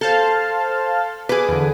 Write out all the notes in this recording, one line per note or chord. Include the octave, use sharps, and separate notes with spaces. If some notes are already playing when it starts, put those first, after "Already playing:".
A4 C5 F5 A5
G#4 B4 D6
E2 D3